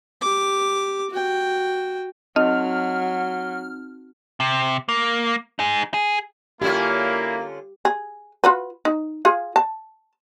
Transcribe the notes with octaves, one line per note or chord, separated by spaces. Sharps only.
G4 D6
F#4 G5
F#3 C4 D#4 D#5 F6
C3
A#3
D#4 G#4
G#4
D3 A#3 C#4 E4 F4 G4
G#4
F4 F#4 B4
D#4
F4 G#4 F5
A5